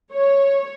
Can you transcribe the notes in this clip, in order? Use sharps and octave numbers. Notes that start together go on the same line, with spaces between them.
C#5